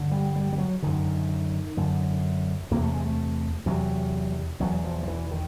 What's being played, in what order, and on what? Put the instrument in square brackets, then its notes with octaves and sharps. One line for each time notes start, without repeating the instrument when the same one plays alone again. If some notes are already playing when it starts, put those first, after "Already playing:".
Already playing: [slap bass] G2 D3
G3
G3
G3
F#3
F#2 D3 D#3
F#2 D3
E2 C3 A#3
A3
G#3
A3
E2 C3 F#3
E2 B2 F#3
F3
F3
E3
D#3